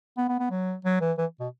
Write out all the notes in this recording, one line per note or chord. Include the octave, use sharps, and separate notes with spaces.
B3
B3
B3
F#3
F#3
E3
E3
B2